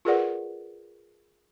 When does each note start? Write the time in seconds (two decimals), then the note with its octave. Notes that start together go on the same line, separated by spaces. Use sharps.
0.05 F4 G#4 A#4 B4 D5 F#5